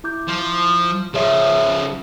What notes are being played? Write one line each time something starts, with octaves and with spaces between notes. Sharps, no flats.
E4 D6 G6
F3
C#3 F3 G#4 C#5 E5